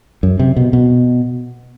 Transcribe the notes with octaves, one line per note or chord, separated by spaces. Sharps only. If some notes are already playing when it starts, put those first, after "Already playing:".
F#2
C3
B2
B2